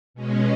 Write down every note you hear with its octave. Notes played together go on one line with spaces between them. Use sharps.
B2 G#3 C#4